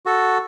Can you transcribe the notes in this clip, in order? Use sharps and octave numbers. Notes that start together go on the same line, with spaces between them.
F#4 A4